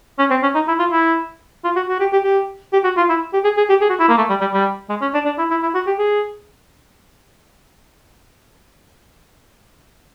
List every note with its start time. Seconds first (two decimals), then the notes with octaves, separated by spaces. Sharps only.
0.19 C#4
0.30 C4
0.43 C#4
0.55 D#4
0.68 E4
0.79 F4
0.91 E4
1.64 F4
1.76 F#4
1.88 F#4
2.00 G4
2.13 G4
2.24 G4
2.73 G4
2.84 F#4
2.97 F4
3.09 E4
3.33 G4
3.44 G#4
3.57 G#4
3.70 G4
3.81 G#4
3.89 F#4
3.99 E4
4.09 A#3
4.18 A3
4.30 G3
4.41 G3
4.54 G3
4.89 G#3
5.01 C#4
5.14 D4
5.25 D4
5.38 E4
5.50 E4
5.63 E4
5.75 F#4
5.87 G4
5.98 G#4